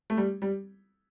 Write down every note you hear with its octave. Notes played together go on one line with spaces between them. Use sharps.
A3
G3
G3